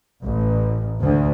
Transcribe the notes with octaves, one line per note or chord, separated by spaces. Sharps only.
A1
D2